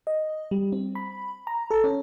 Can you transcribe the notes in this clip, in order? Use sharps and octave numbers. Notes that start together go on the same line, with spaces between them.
D#5
G3
C4
B5
A#5
A4
C#4